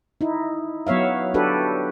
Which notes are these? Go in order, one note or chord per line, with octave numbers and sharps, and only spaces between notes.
D#4 E4
F#3 B3 C#5 E5 F5
D4 F#4 G4 A4 B4